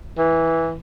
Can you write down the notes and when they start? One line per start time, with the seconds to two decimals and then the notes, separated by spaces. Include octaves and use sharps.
0.18 E3